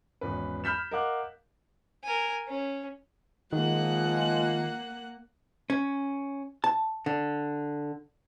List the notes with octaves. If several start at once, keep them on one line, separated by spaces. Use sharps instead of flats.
G#1 E2 C#4 B4
B5 F6 G6 B6 E7
A#4 D#5 F5 F#5 D6 F#6
A#4 G#5
C#4
D#3 F3 G#3 A#3 F4 F#5 F#6
C#4
A5
D3